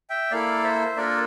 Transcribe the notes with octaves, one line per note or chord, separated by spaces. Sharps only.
E5 G5
A#3 E4 A4 D5 F5
C5 E5
A#3 D4 F4 A4 A#4 D5